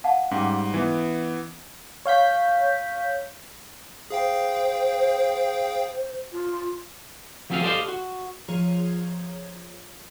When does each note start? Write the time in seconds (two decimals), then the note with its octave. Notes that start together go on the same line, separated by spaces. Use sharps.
0.04 F5 F#5 A5
0.31 G#2 G3 C#4
0.74 E3 B3
2.05 C#5 F5 G6 B6
4.11 G#4 C5 F5 G5
6.32 F4
7.50 F3 F#3 C4 F4 G#4 F5
7.63 G4 A4 C5 D5 D#5 F5
7.88 F#4
8.48 F3 F4 G#4 C#5 A#5